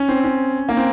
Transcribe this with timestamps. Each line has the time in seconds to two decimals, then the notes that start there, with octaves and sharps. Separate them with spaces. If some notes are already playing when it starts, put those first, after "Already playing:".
Already playing: C#4
0.09 C4
0.24 C#4
0.69 A#3
0.77 C4